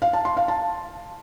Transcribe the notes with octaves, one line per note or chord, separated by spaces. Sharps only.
F5
A5
C6
F5
A5